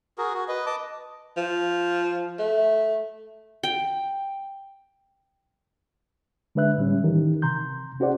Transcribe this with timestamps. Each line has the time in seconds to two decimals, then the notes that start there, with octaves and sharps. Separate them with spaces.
0.18 F#4 G#4 A#4
0.34 F#4
0.48 B4 D#5
0.66 D#5 A5 D6
1.37 F3
2.39 A3
3.63 G5
6.55 D3 G#3 D4 B4 E5 F#6
6.78 A2 G3 C#4
7.04 D#3 E3 D#4 G4 A#4
7.42 C3 A#5 C6 G6
8.00 C#4 F#4 G#4 C5 D5 F#5